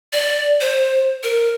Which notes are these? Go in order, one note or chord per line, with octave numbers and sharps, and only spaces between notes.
D5
C5
A#4